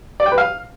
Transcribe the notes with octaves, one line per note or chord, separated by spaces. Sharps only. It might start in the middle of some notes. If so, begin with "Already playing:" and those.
D5
G5
B4
F5